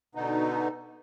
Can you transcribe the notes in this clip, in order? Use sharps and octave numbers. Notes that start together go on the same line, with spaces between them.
B2 D3 B3 D#4